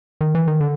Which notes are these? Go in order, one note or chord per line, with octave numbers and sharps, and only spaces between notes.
D#3
E3
D#3
D3